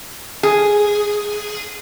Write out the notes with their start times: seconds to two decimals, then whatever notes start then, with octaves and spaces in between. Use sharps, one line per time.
0.43 G#4